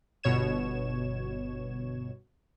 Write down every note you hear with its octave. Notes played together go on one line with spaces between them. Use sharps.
G1 B2 C#5 G#6 E7